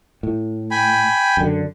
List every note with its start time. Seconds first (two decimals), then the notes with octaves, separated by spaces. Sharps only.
0.23 A2
0.71 G5 G#5 B5
1.37 F#2 D3